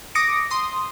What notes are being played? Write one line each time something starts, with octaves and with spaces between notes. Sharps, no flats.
D6 D#6 A#6 C#7 D7
C6 D#6